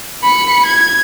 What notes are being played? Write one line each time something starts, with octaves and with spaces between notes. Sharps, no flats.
B5 C#7
G#6